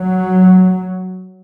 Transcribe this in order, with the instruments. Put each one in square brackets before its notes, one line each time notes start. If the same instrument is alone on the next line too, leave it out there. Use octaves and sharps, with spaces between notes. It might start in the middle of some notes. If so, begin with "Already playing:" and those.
Already playing: [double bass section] F#3